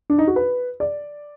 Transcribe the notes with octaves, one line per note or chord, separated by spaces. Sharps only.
D4
D#4
F#4
B4
D5